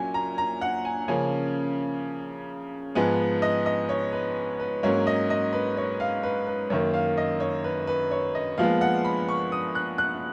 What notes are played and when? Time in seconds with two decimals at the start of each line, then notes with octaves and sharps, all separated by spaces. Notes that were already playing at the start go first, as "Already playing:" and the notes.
Already playing: A#2 F#3 C#4 G#5
0.14 A#5
0.38 A#5
0.61 F#5
0.85 G#5
1.08 C#3 F3 A#3 C#4 G#5
2.95 G#2 F3 G#3 B3 G#5
3.42 D#5
3.66 D#5
3.89 C#5
4.13 B4
4.60 B4
4.83 G#2 F#3 A#3 C#4 C#5
5.07 D#5
5.30 D#5
5.53 B4
5.77 C#5
6.00 F5
6.23 B4
6.47 B4
6.70 F#2 D#3 A#3 C#5
6.94 F5
7.17 D#5
7.40 C#5
7.64 B4
7.87 B4
8.11 C#5
8.35 D#5
8.58 A#2 F3 G#3 B3 F5
8.81 F#5
9.05 B5
9.29 C#6
9.52 D#6
9.75 F#6
9.98 F#6